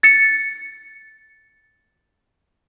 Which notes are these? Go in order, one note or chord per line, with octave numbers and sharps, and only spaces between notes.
A6 C#7